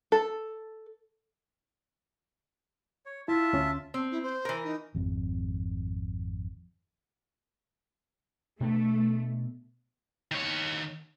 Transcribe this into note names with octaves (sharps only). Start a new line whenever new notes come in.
A4
C#5
E4 F4 E5 A5
D2 C#4
C4
E4
C5
E3 A#4
D#4
G#1 F2
B2 A3 B3 D4
D#3 C#5